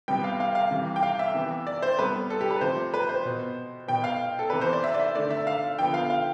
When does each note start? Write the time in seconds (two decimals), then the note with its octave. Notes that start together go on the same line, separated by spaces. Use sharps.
0.08 C3 G3 B3 G5
0.24 F5
0.40 F5
0.55 F5
0.71 C3 E3 G3
0.96 G5
1.03 F5
1.19 E5
1.34 C3 E3 B3
1.67 D5
1.82 C5
1.99 C3 G3 B3 B4
2.30 A4
2.41 G4
2.51 B4
2.61 C3 F3 A3 C5
2.94 B4
3.09 C5
3.25 B2 B3
3.88 B2 B3 G5
4.04 F5
4.39 A4
4.50 C3 E3 B3 B4
4.61 C5
4.73 D5
4.84 E5
4.94 D5
5.00 E5
5.15 D3 A3 D5
5.30 E5
5.47 F5
5.79 D3 F3 B3 G5
5.94 F5
6.10 F5